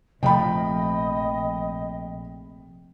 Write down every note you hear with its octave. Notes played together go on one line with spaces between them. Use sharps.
A#1 C3 F3 A3 D#5 G5 B5